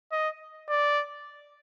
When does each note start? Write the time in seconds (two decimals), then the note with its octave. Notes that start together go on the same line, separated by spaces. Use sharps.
0.12 D#5
0.69 D5